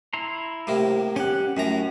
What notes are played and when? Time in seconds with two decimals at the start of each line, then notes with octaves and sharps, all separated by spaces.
0.13 E4 A#5 C6
0.67 A2 C3 A#3
1.16 C#4 G4 F#5
1.57 F#2 A2 C#4 A#5